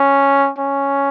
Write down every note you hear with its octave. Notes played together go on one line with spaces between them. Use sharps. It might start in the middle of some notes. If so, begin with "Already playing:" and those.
Already playing: C#4
C#4